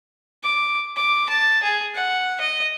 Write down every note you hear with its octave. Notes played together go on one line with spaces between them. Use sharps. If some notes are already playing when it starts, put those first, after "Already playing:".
D6
D6
A5
G#4
F#5
D#5